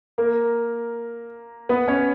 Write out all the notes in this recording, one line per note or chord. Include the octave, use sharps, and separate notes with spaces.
A#3 A#4
B3 B4
C#4 C#5